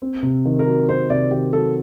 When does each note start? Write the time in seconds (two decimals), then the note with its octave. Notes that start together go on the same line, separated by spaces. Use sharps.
0.02 C4
0.23 C3
0.45 D#3
0.59 A#4
0.66 F#3
0.89 C4 C5
1.10 C3 D5
1.31 D#3 G4
1.53 F#3 A4